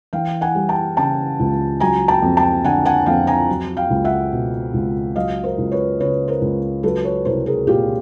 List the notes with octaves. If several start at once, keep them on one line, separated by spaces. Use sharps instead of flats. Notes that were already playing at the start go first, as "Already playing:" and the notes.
E3 F5 G5
F#5 G#5
G3
G5 A5
C#3 G5 A5
C#2
F#3 G#5 A#5
G5 A5
F2
G5 A5
D3 F#5 G#5
F#5 G#5
F2 F5 G5
G#5 A#5
F#3
F5 G5
C#2
E5 F#5
B2
C#2
F#3 D#5 F5
A#4 C5
C#2
B4 C#5
C#3 B4 C#5
A#4 C5
C#2
F#3 A4 B4
B4 C#5
C2 A#4 C5
G#4 A#4
A#2 F4 G4